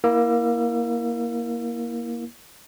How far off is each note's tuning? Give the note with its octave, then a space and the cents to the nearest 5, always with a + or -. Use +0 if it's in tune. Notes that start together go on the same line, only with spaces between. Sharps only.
A#3 +15 E4 -10 E6 +35